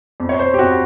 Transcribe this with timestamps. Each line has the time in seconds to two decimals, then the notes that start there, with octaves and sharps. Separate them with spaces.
0.20 F2
0.29 C#5
0.39 C5
0.54 G4
0.59 F2 F#4